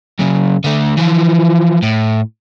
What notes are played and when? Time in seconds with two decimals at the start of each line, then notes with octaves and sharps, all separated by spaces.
0.20 F#2 C#3
0.64 D3 A3
0.97 E3 F3
1.83 A2